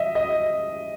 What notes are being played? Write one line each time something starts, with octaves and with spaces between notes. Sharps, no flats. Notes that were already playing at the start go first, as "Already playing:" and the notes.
Already playing: D#5 E5
D#5